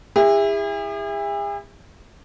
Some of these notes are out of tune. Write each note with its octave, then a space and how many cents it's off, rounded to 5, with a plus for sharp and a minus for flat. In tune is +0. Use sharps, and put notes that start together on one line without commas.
E4 +0 G#4 -45